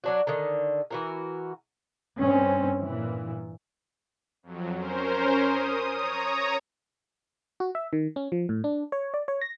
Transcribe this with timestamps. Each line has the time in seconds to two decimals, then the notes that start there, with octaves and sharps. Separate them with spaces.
0.04 F#3 D4 F#4
0.27 D3 D#3
0.91 E3 F#4 A#4
2.19 G2 C4 C#4
2.82 A#2 E3
4.43 F2 F#3
4.75 C#4 A#4 C5
5.38 D#6
5.92 C#5 A#5 D#6
7.60 F#4
7.75 E5
7.93 D#3
8.16 C#4
8.32 F3
8.49 A2
8.64 D4
8.92 C#5
9.14 D5
9.28 C#5
9.41 A#6